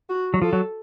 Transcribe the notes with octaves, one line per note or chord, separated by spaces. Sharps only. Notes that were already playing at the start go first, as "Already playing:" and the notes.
F#4
F#3
F3 A4
F#3